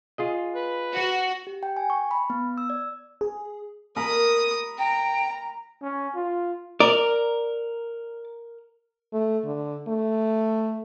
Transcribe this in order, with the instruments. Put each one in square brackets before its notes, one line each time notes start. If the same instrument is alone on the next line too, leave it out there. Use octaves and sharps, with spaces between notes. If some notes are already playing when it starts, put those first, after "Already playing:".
[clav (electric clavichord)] F4 G#4 D#5
[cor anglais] B4
[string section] F#4
[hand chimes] G4
G5
G#5
C#6
B5
B3
E6
D5
[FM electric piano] G#4
[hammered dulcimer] A#4 B5 [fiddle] D#6
[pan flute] G5 [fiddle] A#5
[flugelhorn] C#4
F4
[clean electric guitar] A#4 [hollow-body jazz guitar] D5
[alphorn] A3
D3
A3